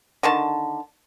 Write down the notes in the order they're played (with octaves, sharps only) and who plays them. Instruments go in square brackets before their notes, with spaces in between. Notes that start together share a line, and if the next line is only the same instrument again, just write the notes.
[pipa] D3 D#3 A5